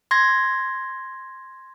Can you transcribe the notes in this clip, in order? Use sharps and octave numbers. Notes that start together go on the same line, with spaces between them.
C6 G#6 A#6